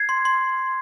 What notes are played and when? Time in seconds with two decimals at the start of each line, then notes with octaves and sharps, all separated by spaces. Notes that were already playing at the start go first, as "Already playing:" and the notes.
Already playing: G#6 C7
0.09 C6
0.25 C6